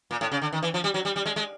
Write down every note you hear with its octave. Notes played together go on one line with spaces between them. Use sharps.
A#2
A2
C#3
D3
D#3
E3
F3
G3
F#3
G3
G3
G#3
G#3